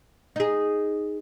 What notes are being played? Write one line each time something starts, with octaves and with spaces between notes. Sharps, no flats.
D#4 G#4